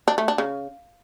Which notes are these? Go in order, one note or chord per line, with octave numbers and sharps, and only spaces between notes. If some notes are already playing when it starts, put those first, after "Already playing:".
D4
A3
D4
C#3